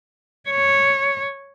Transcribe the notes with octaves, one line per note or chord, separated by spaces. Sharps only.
C#5